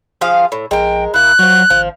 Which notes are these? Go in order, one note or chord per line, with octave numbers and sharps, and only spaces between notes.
F3 G#4 F5
A2
A#1 G#3 A#4 G5
E1 A#3 E4 F#6
F3 F#3 F#4
G#1 F3